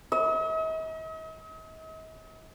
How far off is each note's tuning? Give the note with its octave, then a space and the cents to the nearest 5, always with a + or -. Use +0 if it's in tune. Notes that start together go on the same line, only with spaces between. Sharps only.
D#5 +45